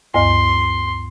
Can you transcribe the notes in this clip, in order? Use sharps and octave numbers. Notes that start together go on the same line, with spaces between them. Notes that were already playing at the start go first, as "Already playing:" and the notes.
D2 G2 C6